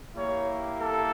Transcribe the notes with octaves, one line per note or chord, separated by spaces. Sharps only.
A#3 E4 G4 C#5
A4